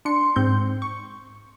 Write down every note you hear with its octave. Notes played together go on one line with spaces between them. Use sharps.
D4 C6 C#7
G#2 C4 G6
C#6